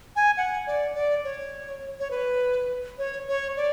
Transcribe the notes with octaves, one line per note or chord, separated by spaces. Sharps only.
G#5
F#5
D5
D5
C#5
C#5
B4
C#5
C#5
D5